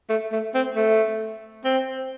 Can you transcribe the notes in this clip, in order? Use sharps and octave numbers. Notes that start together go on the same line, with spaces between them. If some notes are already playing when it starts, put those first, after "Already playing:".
A3
A3
C4
A3
C4